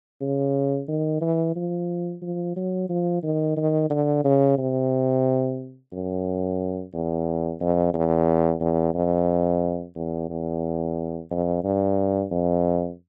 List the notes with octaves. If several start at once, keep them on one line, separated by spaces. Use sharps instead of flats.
C#3
D#3
E3
F3
F3
F#3
F3
D#3
D#3
D3
C#3
C3
F#2
E2
F2
E2
E2
F2
E2
E2
F2
G2
F2